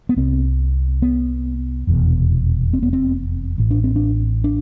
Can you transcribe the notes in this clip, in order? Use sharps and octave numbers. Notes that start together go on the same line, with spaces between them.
B3
C2 C3 C4
B3
F1 E2 B2
C4
B3
C4
A1 A2
D4
C4
D4
D4